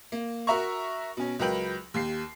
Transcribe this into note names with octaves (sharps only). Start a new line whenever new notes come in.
A#3
F#4 A#4 E5 A#5 C#6
B2 C#4
C#2 F#3 A#4 B4 G5 F#7
D#2 G4 C7